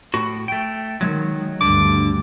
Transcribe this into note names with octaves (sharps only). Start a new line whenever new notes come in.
A2 F#4
A3 G5
D#3 F#3 G#3
D2 G2 D3 D6